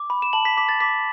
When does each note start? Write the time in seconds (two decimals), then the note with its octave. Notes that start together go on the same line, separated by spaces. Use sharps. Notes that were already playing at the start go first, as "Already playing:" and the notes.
Already playing: D6
0.10 B5
0.22 E7
0.33 A5 F#7
0.45 B6
0.57 D6 B6
0.69 A6
0.80 D6 B6